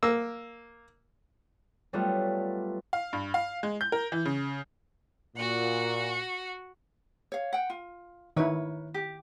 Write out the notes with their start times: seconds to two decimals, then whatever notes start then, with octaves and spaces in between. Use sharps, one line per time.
0.03 A#3 E6
1.93 F#3 G3 A3 B3 F4
2.93 F5
3.13 G2
3.34 F5
3.63 G#3
3.81 G6
3.92 A#4
4.12 E3
4.25 C#3
5.37 A#2 F#4 F#5
7.32 C#5 F5
7.53 F#5 G5
7.70 F4
8.37 D#3 E4 A#4 B4 C#5
8.94 G4